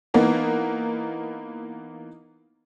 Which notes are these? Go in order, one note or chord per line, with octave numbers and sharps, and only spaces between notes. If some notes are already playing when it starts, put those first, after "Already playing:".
E3 A#3 B3 D#4